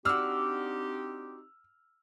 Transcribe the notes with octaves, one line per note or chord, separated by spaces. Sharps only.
C4 D4 D#4 F#4 G4 E6 F6